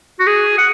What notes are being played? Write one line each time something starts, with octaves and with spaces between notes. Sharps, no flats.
F#4
G#4
F#5